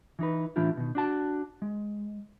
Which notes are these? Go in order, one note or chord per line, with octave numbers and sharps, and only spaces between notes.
E3 D#4 B4
A2 E3 D4 E4 F4 G4
B2 D#3
D4 F#4 A5
G#3